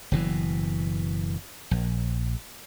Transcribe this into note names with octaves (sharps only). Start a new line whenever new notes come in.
F#1 B2 E3
A#1